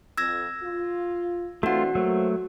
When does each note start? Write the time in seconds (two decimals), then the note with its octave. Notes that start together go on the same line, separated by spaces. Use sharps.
0.18 F2 E6 G#6 A#6
0.63 F4
1.63 E3 A3 C4 D4 F4 F#4 F#5
1.95 F#3 A3 A#3 A4 C5